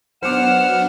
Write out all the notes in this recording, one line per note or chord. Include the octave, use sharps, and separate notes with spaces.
F#3 B3 D4 C5 F#5 D6 F6 E7